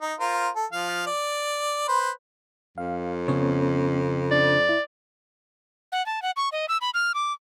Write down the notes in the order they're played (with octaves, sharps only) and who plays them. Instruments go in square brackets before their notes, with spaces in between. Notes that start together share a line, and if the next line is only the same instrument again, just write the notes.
[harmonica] D#4
F4 A#4 C5
A4
F3 F5
D5
B4 C5
[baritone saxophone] F2 [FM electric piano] F5
[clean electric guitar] C#3 [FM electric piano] B3 C#4 C#5
[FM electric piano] D4 [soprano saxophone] D5
[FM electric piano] E4
[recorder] F#5
A5
F#5
C#6
D#5
E6
B5
F6
D6